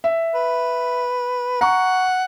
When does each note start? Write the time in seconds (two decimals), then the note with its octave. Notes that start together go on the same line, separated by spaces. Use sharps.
0.04 E5
0.35 B4
1.61 F#5 A#5 C#6